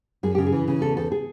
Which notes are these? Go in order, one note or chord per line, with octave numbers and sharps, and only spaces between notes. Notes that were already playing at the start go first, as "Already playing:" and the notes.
F#2 G#4
C#3 G4
G#4
E3
C#3
E2 A4
E2 A4
G#4